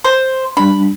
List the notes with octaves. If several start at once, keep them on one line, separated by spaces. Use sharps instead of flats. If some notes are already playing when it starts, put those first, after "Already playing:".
C5
G3 D4 B5